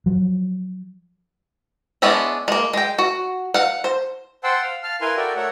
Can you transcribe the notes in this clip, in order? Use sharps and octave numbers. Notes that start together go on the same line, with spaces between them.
F3 F#3
G#3 B3 C#4 D4 E4
G#3 A#3
G#3 G5
F#4
F5 F#5
C5
C5 F#5 G5 A5 C6 E6
F5
F5 A5 F6
E4 A#4 B4 F5 G#5 C6
F#4 A4 A#4 D5 E5 G5
A3 A4 A#4 C#5 E5 F#5